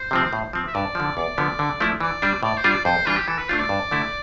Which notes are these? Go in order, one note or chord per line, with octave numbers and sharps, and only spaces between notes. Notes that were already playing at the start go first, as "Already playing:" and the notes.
Already playing: C5
C3 F3 C4
A2
F3 C4
E5
G2 D5
D3 F3
E2 D5
D3 F3 B3
D3
F3 A3 E4
E3 D5
G3 D4
A2 D5
C5
G3 D4 F4
D5
F2 C5
E3 G3 D4 F4
G4
E3 A4
B4
A3 D4 F4 C5
D5
G2
D3 A3 E4